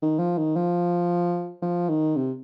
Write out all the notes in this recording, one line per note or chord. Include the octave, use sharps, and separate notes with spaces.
D#3
F3
D#3
F3
F3
D#3
C3